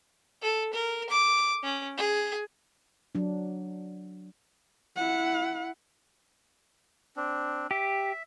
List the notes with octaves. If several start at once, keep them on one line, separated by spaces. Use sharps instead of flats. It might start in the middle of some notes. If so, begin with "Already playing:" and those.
A4
A#4
D6
C#4
G#4
F#3 D4
E4 F#5
C4 D4
G4 E5